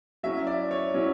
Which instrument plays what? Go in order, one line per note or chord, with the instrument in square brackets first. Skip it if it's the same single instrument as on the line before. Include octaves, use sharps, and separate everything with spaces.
[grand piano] F#3 C#4 E4 E5
D5
C#5
F#3 C#4 E4